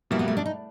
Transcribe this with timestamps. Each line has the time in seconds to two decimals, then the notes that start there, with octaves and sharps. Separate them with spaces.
0.11 B2 G3 A#3 E4
0.19 B3
0.28 A3
0.37 D4
0.46 D#4